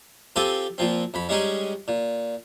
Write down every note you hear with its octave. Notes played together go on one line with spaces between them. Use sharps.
C4 F4 G4 A4 G#5
A#2 F3 C4
F2 B5
G3 G#3 C#4 D#4 G#4
A#2